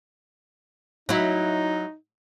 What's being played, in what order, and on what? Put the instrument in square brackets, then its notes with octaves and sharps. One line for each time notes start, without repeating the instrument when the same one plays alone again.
[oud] F#3 E4 [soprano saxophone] D#4